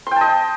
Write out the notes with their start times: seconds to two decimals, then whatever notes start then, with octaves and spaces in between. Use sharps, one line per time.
0.07 C6
0.11 G5
0.16 A5
0.21 D#5